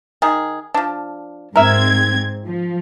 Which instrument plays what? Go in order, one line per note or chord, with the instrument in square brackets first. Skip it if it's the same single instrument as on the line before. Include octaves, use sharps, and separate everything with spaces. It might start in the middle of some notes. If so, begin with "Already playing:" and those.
[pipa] D#3 G#4
F3 D4
[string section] G#2 C4 G#6 [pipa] A#4 E5
[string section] F3